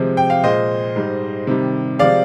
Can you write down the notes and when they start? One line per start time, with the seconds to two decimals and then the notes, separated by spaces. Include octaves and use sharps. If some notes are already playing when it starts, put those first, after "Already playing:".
Already playing: C3 F3 G#3
0.17 G5
0.30 F5
0.43 A#2 G#3 C5 D#5
0.96 G#2 G3
1.47 C3 D#3 G3
1.99 C3 F3 G#3 D5 F5